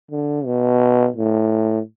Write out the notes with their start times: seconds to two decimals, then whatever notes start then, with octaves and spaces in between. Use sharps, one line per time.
0.11 D3
0.45 B2
1.16 A2